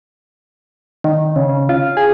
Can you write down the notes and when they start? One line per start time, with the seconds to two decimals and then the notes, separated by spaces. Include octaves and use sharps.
1.04 D#3
1.36 C#3
1.49 C#3
1.69 F4
1.97 G#4